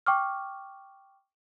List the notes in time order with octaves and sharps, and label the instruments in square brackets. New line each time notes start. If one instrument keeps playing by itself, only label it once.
[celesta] G5 C#6 D6 F6